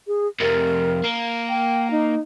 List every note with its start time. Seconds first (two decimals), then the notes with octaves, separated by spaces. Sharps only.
0.07 G#4
0.40 F2 C3 A#4
1.04 A#3
1.49 G5
1.91 D#4